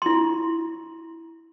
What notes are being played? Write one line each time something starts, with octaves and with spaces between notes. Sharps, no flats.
E4 C6